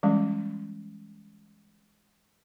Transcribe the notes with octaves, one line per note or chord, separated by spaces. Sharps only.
E3 G3 G#3 C#4